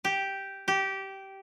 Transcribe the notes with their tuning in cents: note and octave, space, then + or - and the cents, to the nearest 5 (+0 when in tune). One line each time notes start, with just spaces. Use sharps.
G4 -5
G4 -15